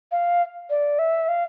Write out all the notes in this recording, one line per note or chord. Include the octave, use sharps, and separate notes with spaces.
F5
D5
E5
F5